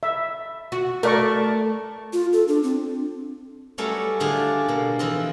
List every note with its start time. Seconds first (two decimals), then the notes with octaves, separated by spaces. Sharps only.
0.03 E5
0.72 F#4
1.03 A3 A#4 D5 C#6
2.13 F4
2.33 A4
2.48 D4
2.63 C4
3.78 F#3 G3 A3 C#4 B4 E5
4.20 A2 D3 D4 F4 G4 G#4
4.68 B2 D3 A#3
4.99 E3 F3 C4 E4 F4 D#5